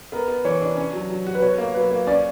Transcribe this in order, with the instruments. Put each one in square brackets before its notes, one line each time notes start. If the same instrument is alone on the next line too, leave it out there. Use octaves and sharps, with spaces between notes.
[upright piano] B3 [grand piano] A#4
[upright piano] B3
[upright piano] E3 [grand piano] C#5
[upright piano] D4
C#4
F#3
F#3
F#4
[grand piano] B4
[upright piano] B2 [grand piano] C#5
[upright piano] A#3
[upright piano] F#3 [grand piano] B4
[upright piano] A#3
[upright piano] C#4 [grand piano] D5